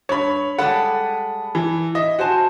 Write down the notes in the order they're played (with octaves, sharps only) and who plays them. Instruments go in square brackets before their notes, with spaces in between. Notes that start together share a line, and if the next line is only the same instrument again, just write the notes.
[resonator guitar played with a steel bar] G2 [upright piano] C#5 B5
[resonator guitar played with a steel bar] G3 G#3 A4 [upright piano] F#5 B5
[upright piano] E3
[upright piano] D#5 [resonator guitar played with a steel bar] E5
[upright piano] F#4 C5 [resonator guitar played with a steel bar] G#5 A5